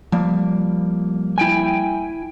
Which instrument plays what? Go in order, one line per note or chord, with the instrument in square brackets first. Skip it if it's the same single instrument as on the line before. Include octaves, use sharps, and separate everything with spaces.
[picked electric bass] F3 G3 A#3
[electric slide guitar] E4 G5 G#5